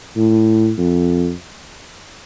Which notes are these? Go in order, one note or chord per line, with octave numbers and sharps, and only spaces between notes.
A2
F2